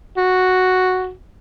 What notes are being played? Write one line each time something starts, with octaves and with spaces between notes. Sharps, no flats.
F#4